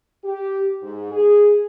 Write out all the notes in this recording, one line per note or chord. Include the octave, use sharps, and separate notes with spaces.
G4
G#2
G#4